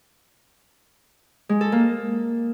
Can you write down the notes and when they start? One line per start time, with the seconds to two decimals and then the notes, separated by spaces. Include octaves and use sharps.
1.49 G#3
1.61 A4
1.72 A#3